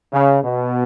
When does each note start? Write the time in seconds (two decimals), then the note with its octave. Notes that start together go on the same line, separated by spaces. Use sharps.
0.13 C#3
0.43 B2